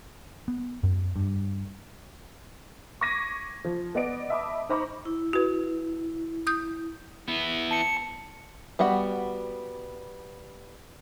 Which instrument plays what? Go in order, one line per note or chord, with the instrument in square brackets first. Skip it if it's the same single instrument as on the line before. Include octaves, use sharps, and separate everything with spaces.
[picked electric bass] B3
F#2
G2
[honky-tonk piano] C#6 D6 G#6 A#6 B6 D#7
F3
B3 D5 D#5 D7
D#5 E5 A5 B5 D6 D#6
D#4 C5 A#5 B5 C#6 D6
[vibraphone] E4
[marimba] F#4 B4
D#6 G6
[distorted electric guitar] B3 E4
[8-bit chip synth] A5 C#7
[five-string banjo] G3 B3 F#4 F#5